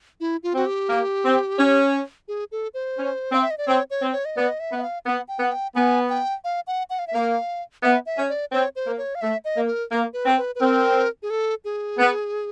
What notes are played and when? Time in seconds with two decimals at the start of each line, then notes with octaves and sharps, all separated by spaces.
0.20 E4
0.43 F4
0.54 C4 F#4
0.66 G4
0.89 A#3
1.25 C4
1.58 C#4
2.28 G#4
2.52 A4
2.74 C5
2.98 C#4
3.32 C4 F5
3.42 E5
3.51 D#5
3.58 D5
3.67 C4 C#5
3.90 C#5
4.01 C4
4.12 C#5
4.25 D#5
4.36 B3 D5
4.48 D#5
4.60 E5
4.70 B3
4.78 E5
4.82 F5
5.05 B3 F#5
5.28 G5
5.40 B3
5.46 F#5
5.51 G5
5.75 B3 G#5
6.09 G5
6.44 F5
6.67 F#5
6.90 F#5
6.99 F5
7.07 E5
7.14 A#3 F5
7.83 B3 E5
8.06 E5
8.17 C#4
8.29 D5
8.52 C4 C#5
8.76 C5
8.87 A#3
8.98 C#5
9.15 F5
9.21 A3 E5
9.45 D#5
9.56 A#3
9.67 A#4
9.91 A#3
10.13 B4
10.26 C4
10.37 B4
10.55 B4
10.60 C4 A#4
11.23 G#4
11.30 A4
11.65 G#4
11.99 B3